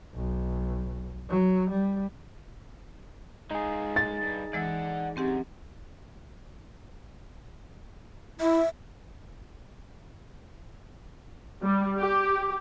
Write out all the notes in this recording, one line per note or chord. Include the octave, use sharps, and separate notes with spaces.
B1
F#3
G3
G#3 D#4 F4 G#4
A6
G2
E3 G#3 D5 F#5 E6
F#2 C4 G4 F#5
E4 E5
G3
G4